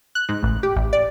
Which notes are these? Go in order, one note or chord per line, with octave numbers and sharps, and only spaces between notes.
F#6
G#2
A1
G4
A1
D5